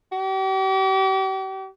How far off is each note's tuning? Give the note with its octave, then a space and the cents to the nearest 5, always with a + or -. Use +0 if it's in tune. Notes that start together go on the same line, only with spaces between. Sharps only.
G4 -40